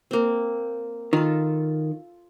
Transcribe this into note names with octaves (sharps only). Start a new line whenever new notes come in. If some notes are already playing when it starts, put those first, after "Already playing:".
A#3 C4
D#3 F4 A4